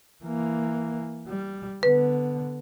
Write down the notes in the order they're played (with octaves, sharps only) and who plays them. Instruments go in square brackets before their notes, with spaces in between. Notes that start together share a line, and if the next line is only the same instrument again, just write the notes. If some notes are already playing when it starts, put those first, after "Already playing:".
[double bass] E3 A#3
G3
[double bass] D3 B3 [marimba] B4